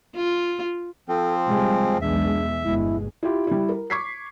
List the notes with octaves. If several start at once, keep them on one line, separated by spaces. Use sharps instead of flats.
F4
F3 C4 A4
C3 G3 G#3
B1 E2 G#3 D4 E5
G1 B2 G#3 E4
E4 F4 G4
G3 E4
A#4
C#6 D6 G#6 B6 C7